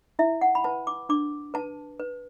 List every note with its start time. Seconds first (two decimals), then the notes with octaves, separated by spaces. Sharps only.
0.19 E4 E5
0.41 F#5
0.55 B5
0.64 B4 A5
0.87 D6
1.09 D4 D6
1.54 B4 A5
1.99 B4